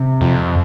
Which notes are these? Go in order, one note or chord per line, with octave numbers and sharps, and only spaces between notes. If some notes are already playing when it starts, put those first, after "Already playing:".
Already playing: C3
F2